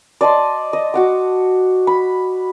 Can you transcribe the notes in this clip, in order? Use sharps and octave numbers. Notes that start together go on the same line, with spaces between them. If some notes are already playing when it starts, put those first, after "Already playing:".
D5 D#5 A5 C6
D#5
F#4 F#5 D6
B5